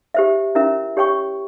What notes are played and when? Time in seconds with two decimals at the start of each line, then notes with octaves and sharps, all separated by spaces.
0.14 G4 C5 E5
0.55 C#4 E4 A#4 E5
0.97 G4 C#5 G5 C#6